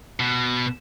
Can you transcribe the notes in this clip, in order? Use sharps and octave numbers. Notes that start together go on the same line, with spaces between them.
B2